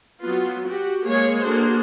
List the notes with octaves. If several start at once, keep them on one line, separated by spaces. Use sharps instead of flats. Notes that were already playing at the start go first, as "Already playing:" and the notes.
F#3 B3 F4
F#4 G4
G#3 A#3 G#4 C#5
A#3 D4 F#4 G#4 A4 C5